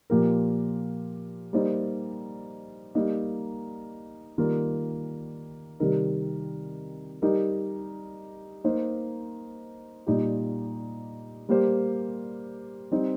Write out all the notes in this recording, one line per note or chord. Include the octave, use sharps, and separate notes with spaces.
A#2 F3 A#3 G4 A#4
G3 A#3 D#4 C5
G3 A#3 D#4
D#3 G3 A#3 F4 A#4
C3 D#3 G3 D#4 A#4
G3 D#4 G4 A#4
A#3 D#4 C5
A#2 G3 D#4 G4
G3 A#3 G4 C5
G3 C4 D#4 C5